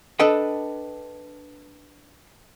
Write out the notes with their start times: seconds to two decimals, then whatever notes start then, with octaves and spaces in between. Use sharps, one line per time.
0.20 D4 A4 B4 D#5 G5